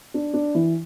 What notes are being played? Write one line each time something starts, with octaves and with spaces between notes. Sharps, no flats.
D4
D4
E3 E4